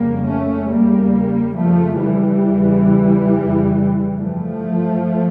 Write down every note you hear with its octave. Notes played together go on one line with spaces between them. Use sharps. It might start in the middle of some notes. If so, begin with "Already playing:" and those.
Already playing: F2 C#3 G3 A#3
A3 C#4
E2 C#3 G3 A#3
F2 C#3 F3 A3
E3 G3
E2 C#3
F2 C#3
G2 F3 A3